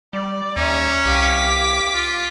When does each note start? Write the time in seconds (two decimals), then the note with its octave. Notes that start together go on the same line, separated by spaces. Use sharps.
0.13 G3 D5
0.57 D#2 C#4 E5 A#5
1.06 C2 G4 F5 D6 B6
1.94 F4